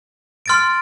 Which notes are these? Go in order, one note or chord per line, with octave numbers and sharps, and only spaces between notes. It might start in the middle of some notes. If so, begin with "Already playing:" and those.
C6 F6 A6 D7